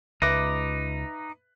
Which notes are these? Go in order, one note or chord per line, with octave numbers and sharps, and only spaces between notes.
C#2 D#4 B4 E5 D6 F#6 A#6